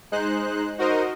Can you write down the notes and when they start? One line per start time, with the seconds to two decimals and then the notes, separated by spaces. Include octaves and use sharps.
0.12 G#3 D#4 C5 F#6
0.78 D#4 F#4 A#4 C5 D#5